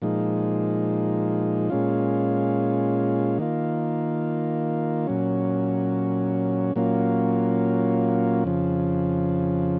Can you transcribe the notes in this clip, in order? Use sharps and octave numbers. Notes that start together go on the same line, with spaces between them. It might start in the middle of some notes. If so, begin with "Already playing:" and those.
A#2 F3 G#3 D#4
A#2 G#3 C#4 F4
D#3 A#3 F4
A#2 F#3 C#4
A#2 F#3 A#3 C#4 F4
F2 C#3 F3